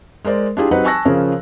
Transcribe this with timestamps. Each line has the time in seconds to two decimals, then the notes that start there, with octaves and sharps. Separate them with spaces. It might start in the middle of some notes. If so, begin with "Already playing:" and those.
0.25 G#3 A#4 C5 D5
0.57 D4 E4 F4 G4 G#4
0.71 F#3 C4 D#4 G4 B4 F#5
0.85 G#5 A5 C#6 E6 F#6 A#6
1.05 C#3 F3 C#4 G#4 A#4